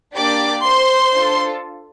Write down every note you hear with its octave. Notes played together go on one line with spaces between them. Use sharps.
A#3 D4 G4 D5 D6
C5 C6
D4 F4 A4